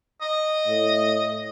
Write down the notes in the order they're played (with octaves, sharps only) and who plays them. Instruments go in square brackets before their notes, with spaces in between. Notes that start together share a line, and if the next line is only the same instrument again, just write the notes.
[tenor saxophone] D#5
[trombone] A2